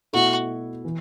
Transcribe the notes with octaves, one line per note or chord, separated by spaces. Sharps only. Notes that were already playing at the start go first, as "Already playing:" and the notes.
B2 A3 E4 F#4
E3